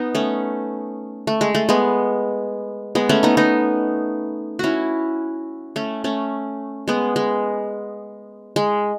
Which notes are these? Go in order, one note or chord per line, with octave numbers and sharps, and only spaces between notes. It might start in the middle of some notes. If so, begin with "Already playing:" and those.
Already playing: B3 D#4
A3 C#4
A3
G#3
A3
G#3 B3
G#3 B3
A3 C#4
B3 D#4
B3 D#4
C#4 E4 F#4
A3 C#4
A3 C#4
G#3 B3
G#3
G#3